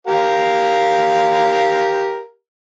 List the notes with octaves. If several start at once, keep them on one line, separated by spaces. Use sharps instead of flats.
G4 A#4 F5